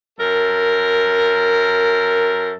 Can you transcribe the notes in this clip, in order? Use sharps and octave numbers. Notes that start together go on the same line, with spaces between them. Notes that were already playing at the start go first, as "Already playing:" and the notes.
F#2 A4 A#4